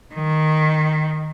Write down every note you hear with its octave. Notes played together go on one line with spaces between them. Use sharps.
D#3